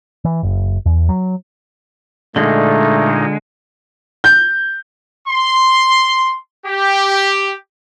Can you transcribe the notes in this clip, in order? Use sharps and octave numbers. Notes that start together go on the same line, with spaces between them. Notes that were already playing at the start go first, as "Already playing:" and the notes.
E3
F#1
E2
F#3
A#2 D3 G#3 A3 D#4
G6
C6
G4